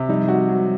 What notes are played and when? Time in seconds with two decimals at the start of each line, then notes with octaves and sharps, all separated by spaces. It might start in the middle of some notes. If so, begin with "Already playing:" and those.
Already playing: C3
0.09 F3 G3 D#4
0.28 F#4
0.48 F#3